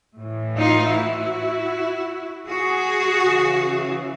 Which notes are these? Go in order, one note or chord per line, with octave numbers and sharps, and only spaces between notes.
A2
E3
D#4 F4
E4 F#4
F#4 G#4
C#3 E3